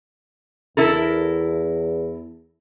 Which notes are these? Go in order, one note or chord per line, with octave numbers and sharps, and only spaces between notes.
E2 E4 A4 A#4